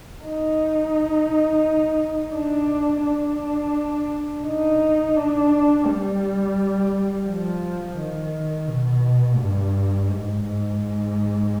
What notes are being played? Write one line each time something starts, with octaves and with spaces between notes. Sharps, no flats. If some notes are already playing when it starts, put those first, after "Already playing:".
D#4
D4
D4
D#4
D4
G3
F3
D#3
B2
G2
G#2
G#2